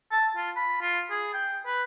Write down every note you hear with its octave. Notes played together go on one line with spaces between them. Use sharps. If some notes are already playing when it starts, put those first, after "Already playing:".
A5
F4
B5
F4
G#4
G5
B4